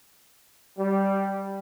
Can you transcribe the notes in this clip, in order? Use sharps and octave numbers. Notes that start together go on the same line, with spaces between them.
G3